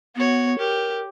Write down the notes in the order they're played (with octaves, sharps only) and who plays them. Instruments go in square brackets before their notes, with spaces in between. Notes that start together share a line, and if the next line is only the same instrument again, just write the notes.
[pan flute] B3 [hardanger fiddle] F#4 C#5
[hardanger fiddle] G4 [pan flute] A#4